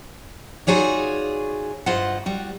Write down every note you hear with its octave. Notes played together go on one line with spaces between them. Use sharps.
D#4 F4 F#4 G#4 C#5 D5
G2 E4 F4 C5 D#5 F#5
G3 F#4